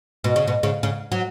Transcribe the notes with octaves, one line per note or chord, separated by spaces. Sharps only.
B2
C#3
B2
C#3
C#3
F#3